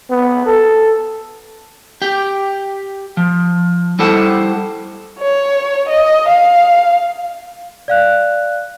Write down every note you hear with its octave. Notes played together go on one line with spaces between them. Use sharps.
B3
A4
G4 G5
F3
G3 E4 A4 C5 F#5 A5
C#5
D#5
F5
D5 F5 F#6